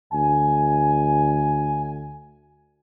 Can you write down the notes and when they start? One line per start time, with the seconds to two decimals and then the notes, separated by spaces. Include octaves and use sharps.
0.13 D2 G#5